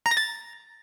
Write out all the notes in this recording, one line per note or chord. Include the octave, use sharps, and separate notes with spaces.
A#5
A#6
A6